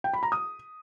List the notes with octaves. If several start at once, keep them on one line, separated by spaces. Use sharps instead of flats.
G5
B5
A#5
D#6